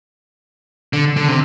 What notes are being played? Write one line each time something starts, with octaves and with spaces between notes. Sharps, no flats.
D3
D3
C3